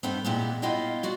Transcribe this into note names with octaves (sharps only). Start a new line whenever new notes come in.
G2 G3 A3 B3 C4
A#2 E3 G3 G#3 B3
B3 E4 F4 D#5 F5 G5
F4 F#4 D5